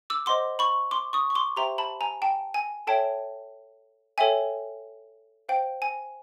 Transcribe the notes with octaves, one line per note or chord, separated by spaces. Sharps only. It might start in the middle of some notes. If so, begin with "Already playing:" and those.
D6 E6
C5 D#5 F#5 C6 D6
B5 C#6
C6 D6
C#6 D#6
C#6
C6 D6
G4 C5 E5 G5 A#5 C6
A5 B5
G#5 A#5
G5 A5
G#5
A4 C#5 E5 G5 A5
A4 C#5 E5 G5 G#5
C5 F5 G5
G#5